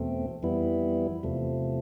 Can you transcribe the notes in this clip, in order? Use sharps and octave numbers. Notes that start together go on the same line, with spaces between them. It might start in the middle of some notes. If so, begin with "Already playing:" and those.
Already playing: E2 B2 A3 C4
F2 E3 G3 B3 E4
E2 C3 F3 A3